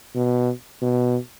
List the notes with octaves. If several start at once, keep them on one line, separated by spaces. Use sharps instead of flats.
B2
B2